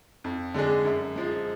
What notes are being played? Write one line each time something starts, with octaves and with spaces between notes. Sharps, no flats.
F2
D3 G#3 D4 G#4
F#2
F3 G#3